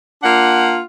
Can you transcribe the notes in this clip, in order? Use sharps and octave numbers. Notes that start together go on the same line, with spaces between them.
A#3 D4 F4 F#5